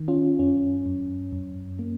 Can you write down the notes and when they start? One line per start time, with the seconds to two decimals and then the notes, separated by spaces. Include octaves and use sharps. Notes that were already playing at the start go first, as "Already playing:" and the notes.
Already playing: D#3
0.08 C#4 F4
0.39 F#2 C#4
0.86 F#2
1.32 F#2
1.79 A#3